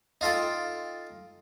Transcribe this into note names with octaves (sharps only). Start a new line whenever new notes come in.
D#4 F4 A4 G5